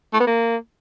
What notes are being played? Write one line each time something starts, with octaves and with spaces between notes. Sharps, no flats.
A3
B3
A#3